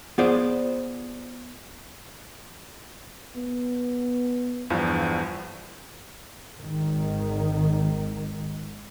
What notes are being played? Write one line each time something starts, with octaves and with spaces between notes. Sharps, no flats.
B3 F4 G#4 C5 D5
B3
E2 G2 F3
G#1 D#3